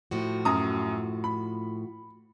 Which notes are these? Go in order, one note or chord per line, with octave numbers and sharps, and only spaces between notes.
A2 F3 F#4
F#2 A#5 D#6
B5